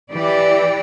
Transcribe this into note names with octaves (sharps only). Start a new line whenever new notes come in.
E3 G4 D5